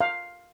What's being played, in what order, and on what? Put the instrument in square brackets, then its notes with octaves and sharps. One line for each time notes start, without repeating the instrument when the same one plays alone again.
[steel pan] F5